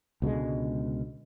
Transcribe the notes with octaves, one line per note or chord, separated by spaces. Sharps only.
C#2 B2 D3 G#3